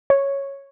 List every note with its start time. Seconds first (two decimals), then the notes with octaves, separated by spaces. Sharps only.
0.10 C#5